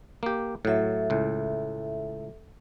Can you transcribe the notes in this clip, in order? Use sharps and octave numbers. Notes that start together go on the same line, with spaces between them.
A#3 G4
A2 F#3 A4 E5
C#2 A2